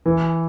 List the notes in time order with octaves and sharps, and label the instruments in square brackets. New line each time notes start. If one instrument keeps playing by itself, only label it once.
[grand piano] E3